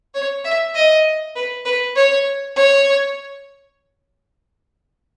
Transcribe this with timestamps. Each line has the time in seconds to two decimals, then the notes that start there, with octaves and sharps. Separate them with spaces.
0.14 C#5
0.44 E5
0.75 D#5
1.36 B4
1.65 B4
1.96 C#5
2.56 C#5